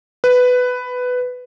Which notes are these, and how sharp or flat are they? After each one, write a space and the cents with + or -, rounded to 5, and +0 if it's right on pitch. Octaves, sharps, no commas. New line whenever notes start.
B4 +10